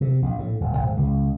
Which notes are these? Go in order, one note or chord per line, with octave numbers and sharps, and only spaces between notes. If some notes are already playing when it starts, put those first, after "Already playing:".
C3
A#1
A2
D#1
G#1
C#2